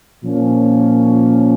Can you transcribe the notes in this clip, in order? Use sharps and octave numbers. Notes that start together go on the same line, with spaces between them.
A#2 F3 A#3 C#4